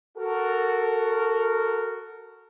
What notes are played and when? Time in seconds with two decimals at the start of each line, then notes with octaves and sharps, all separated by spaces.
0.18 F#4 A4 A#4